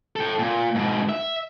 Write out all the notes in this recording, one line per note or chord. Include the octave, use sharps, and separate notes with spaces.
A4 G5
A#2
G#2 B2
E5